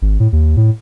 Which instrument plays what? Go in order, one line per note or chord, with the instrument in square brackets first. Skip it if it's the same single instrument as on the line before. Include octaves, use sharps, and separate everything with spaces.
[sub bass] G#1
A2
D#2
A2